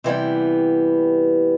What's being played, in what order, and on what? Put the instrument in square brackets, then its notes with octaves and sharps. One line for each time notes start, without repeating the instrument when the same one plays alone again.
[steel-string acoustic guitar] C3 E3 G3 B3